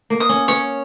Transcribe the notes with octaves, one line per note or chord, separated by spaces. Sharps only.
A#3
D#6
C#4
C#4 C#5